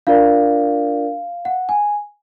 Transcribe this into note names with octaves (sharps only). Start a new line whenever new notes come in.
D4 F4 A#4 D5 F5
F#5
G#5